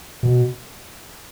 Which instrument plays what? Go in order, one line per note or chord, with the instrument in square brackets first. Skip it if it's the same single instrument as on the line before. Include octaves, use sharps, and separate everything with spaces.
[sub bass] B2